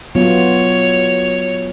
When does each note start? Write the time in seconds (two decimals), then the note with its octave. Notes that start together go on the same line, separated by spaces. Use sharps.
0.15 F#3 B3 F4 C#5